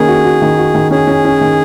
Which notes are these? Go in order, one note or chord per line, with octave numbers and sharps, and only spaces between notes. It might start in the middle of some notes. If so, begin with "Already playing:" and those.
Already playing: D#3 A#3 C#4 G#4
F#4
F#4
D#3
F#4
D#3
C#4 G#4
C#4
C#4
D#3